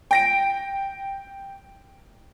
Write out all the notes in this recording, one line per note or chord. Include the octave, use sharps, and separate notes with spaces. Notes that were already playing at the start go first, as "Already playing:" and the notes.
G5 A#6 D7